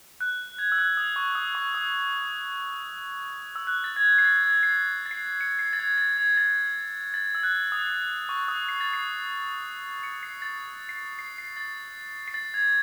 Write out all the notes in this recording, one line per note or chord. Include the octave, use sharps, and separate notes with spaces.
F#6
G#6
E6
F#6
D#6
C#6
D#6
C#6
D#6
E6
F#6
A6
G#6
C7
A6
G#6
C7
A6
C7
C#7
C7
A6
G#6
A6
G#6
A6
A6
E6
F#6
D#6
C#6
D#6
C7
A6
C7
C#7
C7
A6
C7
C7
C7
A6
C7
A6
G#6